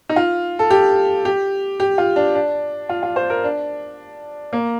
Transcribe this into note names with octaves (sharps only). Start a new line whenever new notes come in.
D#4
F4
A4
G4
G4
G4
F4
D4
D4
F4
F4
C5
A#4
D4
A#3